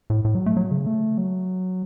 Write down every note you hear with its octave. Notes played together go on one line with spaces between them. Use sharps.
A2
A2
F#3
A3
F#3
C#3
A3
F#3